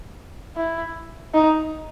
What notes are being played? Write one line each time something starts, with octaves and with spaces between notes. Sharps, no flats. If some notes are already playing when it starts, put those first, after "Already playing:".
E4
D#4